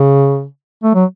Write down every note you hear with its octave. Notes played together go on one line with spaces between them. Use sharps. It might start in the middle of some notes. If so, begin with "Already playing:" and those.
Already playing: C#3
A3
F#3